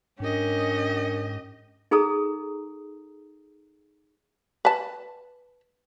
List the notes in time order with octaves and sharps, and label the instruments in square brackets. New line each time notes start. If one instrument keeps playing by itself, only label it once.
[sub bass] G#2 [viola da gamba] C#4 [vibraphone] D4 A#4 [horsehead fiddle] G4 D#5
[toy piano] D#4 G#4 A4 A#5 D#6
[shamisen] B4 A5